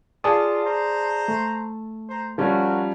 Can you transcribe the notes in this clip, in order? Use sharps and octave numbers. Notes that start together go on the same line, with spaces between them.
F4 G#4 D5 A5 D#6
C5 A#5
A3
C5 A#5
F3 G3 C#4 F#4 A#4